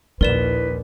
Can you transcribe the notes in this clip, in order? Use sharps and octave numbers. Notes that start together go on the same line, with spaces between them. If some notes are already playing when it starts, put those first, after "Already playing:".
A#1 D#2 E4 A#4 B4 D5 E7